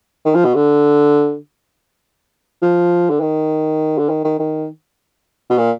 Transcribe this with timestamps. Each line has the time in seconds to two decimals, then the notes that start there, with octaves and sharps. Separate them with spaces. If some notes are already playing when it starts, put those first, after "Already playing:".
0.25 D#3
0.35 F3
0.45 B2
0.55 D3
2.62 F3
3.10 D3
3.21 D#3
3.98 D3
4.09 D#3
4.24 D#3
4.39 D#3
5.50 B2
5.58 A#2